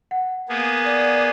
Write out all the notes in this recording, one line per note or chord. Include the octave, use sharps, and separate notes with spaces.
F#5
A#3 B3 G#4
D5